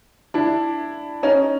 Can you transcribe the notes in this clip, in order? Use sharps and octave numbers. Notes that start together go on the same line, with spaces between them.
D4 E4
C#4 D#4